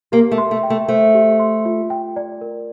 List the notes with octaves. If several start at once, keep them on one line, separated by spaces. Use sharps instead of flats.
A#3 G4
A3
C6
A3
G5
A3
A3 C5
G4
C6
F4
G5
D5
A#4